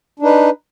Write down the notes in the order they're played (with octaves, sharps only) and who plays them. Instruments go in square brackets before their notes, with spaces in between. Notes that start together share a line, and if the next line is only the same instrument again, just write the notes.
[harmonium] D4
D#4
B4